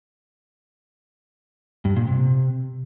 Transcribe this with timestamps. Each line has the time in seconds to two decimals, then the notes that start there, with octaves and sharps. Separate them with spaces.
1.85 G2
1.96 A#2
2.08 C3